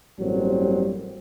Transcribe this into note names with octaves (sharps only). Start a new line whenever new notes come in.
A1 G2 F#3 G3 A#3 C4